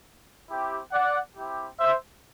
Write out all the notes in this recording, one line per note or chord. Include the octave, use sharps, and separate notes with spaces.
C4 E4 G4
D5 F#5
C4 E4 G4
C5 E5